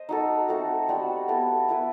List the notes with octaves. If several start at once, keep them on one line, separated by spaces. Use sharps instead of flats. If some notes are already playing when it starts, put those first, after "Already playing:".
Already playing: C5 D#5
D#4 F#4 A4
A3 C4 F#4 A4
G3 C4 F#4
B3 E4 A4
B3 E4 B4